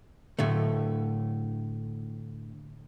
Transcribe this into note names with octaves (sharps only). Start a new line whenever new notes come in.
A2 D3 A3